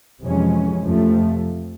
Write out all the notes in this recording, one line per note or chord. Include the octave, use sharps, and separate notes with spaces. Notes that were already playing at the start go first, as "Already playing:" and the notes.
F2 C3 E3 G#3 C#4
F2 C3 F3 A3